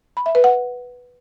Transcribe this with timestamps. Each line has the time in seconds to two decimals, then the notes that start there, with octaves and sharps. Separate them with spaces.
0.17 B5
0.26 E5
0.35 B4
0.44 F#5